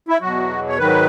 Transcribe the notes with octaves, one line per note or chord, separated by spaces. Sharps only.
E4
E2 B2 F#3 F#4
C#5
G#2 D#3 F#3 B4